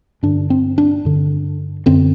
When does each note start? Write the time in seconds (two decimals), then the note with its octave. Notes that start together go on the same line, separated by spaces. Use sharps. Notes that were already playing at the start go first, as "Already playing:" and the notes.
0.23 G2 D3 D4
0.50 C4
0.78 D4
1.05 G2 D3
1.86 F#2 D3 C4